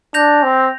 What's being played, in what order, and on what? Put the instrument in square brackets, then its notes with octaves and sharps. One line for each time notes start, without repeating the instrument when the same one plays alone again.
[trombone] D4 [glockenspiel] G6 A#6 F7
[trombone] C4